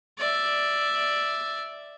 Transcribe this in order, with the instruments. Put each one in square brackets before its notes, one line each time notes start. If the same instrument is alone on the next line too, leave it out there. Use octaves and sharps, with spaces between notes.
[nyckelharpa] D5 E5